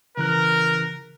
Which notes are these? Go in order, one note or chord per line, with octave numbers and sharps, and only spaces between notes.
C#3 E3 A#4 F#6